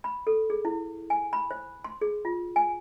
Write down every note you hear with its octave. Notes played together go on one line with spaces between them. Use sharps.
B5
A4
G#4
E4
G#5
B5
C5
C6
G#4
F4
G#5